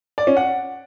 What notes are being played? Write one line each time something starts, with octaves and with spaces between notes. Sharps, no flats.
D5
C#4
F#5